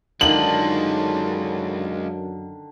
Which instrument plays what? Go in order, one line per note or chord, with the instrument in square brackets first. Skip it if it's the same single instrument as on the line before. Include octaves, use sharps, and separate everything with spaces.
[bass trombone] F#2 [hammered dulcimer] D3 D#3 [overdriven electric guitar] G#3 F4 [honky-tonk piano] F#7